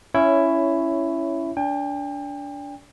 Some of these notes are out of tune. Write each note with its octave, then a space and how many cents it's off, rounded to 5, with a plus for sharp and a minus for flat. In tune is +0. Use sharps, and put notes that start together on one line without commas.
C#4 +0 E4 +10 C#5 +10
D4 -25 G5 +35